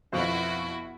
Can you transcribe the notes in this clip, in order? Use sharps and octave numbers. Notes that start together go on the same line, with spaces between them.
F2 B2 B3 E4 F#4 C5